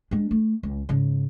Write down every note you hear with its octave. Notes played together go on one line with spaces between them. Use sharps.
G#3 D4
A3
C#2
G#2 C#3